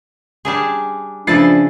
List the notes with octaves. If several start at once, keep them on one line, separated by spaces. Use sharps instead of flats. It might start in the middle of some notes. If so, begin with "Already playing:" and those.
G3 D4 G#4
C#3 F3 D4 E4 B4 A6 C7